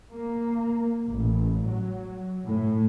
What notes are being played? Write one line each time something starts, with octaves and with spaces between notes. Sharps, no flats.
A#3
A1
F#3
A2